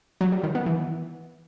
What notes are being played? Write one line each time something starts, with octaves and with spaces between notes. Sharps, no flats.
F#3
G3
D#3
B3
E3